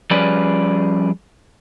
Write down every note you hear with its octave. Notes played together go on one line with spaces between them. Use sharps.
F3 G3 C#4 G#4 B4 D5